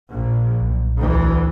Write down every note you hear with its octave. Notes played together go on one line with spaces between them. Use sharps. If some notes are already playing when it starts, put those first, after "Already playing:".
A#1
B1
D2 E3